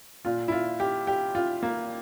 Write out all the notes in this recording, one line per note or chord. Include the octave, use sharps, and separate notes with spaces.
A#2 F4
E4
F4
G4
G4
F4
A#3